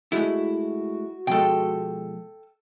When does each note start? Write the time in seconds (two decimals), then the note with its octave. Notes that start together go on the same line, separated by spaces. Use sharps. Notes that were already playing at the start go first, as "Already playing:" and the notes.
0.12 G#3 A3 E4 F#4
1.27 B2 F3 G#3 A4 G5